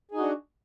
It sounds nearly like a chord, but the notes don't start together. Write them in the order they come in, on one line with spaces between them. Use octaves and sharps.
G#4 D#4 F#4 D4